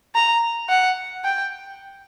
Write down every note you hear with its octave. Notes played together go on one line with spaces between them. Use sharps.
A#5
F#5
G5